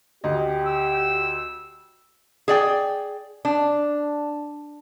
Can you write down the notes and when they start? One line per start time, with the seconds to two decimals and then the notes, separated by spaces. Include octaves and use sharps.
0.24 D2 G4 D#5
0.66 E6
2.48 G#4 D5 G5
3.45 D4